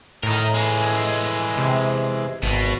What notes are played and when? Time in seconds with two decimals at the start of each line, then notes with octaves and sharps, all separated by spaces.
0.23 A2 D#4 A#4
0.55 E3 G#3
1.57 C3
2.43 G#1 B2